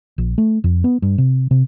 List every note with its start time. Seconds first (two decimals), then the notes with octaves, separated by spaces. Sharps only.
0.18 A#1
0.38 A3
0.64 F2
0.84 B3
1.02 G2
1.18 C3
1.51 C3